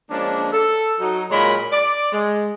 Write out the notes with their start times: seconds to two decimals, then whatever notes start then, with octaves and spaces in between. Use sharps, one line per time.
0.11 F3 G#3 A#3 C#4 D4
0.52 A4
1.00 F#3 D#4
1.30 A#2 F#3 G#3 A#4 C#5 B5
1.72 D5
2.12 G#3